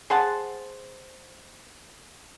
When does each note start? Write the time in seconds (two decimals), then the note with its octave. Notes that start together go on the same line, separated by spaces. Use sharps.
0.10 G#4 C5 F#5 A5